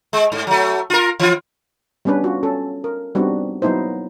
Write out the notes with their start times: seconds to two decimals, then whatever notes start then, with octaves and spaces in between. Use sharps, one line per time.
0.13 G#3
0.32 G#2
0.47 F#3 A3
0.90 F4 A#4
1.20 E3 F4
2.05 G3 B3 C#4 D4 B4
2.24 F4 F#4
2.43 C#4 A4
2.84 A#4
3.15 G3 B3 C4 D4 D#4 F#4
3.62 F#3 A#3 B3 D#4 E4 C5